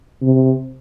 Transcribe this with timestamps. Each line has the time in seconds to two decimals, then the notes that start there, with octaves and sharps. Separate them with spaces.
0.22 C3